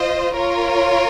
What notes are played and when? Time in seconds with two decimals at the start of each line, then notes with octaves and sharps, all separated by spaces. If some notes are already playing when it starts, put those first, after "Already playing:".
Already playing: F4 C5 D#5
0.35 F4 A#4 C#5